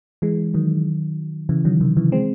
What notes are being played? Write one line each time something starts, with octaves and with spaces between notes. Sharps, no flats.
E3 G#3
D#3 F#3
C#3 E3
D#3 F#3
C3 D#3
C#3 E3
G#3 C4